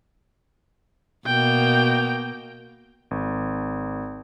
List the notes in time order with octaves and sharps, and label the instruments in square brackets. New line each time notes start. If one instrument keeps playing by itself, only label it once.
[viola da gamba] B2 A#3 [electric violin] G5
[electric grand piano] G#1